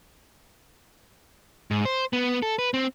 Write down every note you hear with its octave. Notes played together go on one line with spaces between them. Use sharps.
G#2
C5
B3
A4
B4
C4